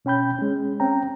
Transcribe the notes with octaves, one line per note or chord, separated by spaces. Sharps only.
B2 C#4 G5 B5 G6
G#3 C#4
C4 C#4 G5 A#5